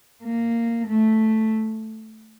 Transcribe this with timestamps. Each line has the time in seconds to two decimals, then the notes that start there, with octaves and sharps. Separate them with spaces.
0.24 A#3
0.88 A3